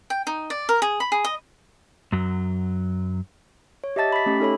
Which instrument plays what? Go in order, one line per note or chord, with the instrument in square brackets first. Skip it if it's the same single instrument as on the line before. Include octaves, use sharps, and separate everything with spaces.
[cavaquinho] G5
D#4
D5
A#4
G#4
B5
G#4
D#5
[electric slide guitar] F#2 F#3
[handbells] C#5
G4 D#5 E5 A5 A6
B5 B6
A3 C#4 G4
D#4 A4 C#5 B5